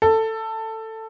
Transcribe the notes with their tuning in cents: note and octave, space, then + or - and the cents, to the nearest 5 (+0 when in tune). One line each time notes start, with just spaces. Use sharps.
A4 +15